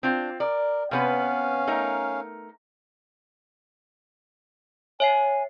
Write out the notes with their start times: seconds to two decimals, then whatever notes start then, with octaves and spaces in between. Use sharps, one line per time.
0.03 C4 D4 F4
0.40 A#4 D5
0.91 C3 B3 C#4 B4 F5
1.67 A3 D#4 A#4
5.00 C#5 E5 G#5 C7